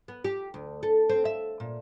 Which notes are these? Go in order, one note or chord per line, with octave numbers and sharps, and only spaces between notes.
B3
G4
D2
A4
C4
E5
A#2